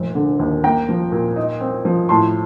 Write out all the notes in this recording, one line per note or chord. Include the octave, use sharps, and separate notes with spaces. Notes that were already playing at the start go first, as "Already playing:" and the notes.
Already playing: F1 A#2
D3
D#2
A#3 G5 A#5
F3
A#2
D#4
C4
F3
A2 A5 C6